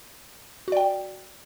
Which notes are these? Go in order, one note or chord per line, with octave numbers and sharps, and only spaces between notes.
F#4 D5 G5